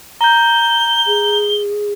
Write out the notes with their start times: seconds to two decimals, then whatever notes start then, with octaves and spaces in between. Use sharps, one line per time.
0.21 A#5 G6 G7
1.07 G#4